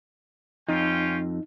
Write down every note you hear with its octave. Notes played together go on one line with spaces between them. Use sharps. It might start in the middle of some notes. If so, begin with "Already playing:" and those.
F2 C#4 D#4 F4 G5